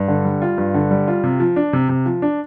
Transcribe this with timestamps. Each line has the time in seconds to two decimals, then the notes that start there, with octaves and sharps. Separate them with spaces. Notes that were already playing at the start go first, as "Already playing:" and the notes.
Already playing: G2
0.08 D3
0.25 G3
0.42 F4
0.58 G2
0.74 D3
0.91 G3
1.08 F4
1.24 C3
1.40 F3
1.56 D4
1.73 C3
1.89 C3
2.06 F3
2.22 D4